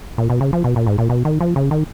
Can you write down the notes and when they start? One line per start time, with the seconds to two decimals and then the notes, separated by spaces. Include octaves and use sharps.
0.18 A#2
0.30 B2
0.41 C#3
0.53 F3
0.64 B2
0.76 A#2
0.87 G#2
0.98 A#2
1.09 B2
1.25 D#3
1.41 F3
1.56 C#3
1.71 D#3